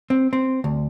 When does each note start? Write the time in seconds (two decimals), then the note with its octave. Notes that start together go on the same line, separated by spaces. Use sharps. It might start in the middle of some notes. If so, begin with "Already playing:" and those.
0.10 C4
0.33 C4
0.64 D2